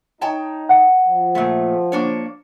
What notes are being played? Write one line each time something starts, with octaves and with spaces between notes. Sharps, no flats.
D#4 C#5 G5 A5
F#5
F3
A#2 A3
A#3 D4 C#5